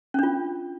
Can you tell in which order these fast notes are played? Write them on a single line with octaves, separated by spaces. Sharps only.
C#4 D4 F4